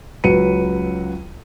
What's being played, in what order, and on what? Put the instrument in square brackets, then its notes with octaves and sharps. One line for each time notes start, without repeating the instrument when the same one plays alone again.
[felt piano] C#2 F#3 B4 C#7 D#7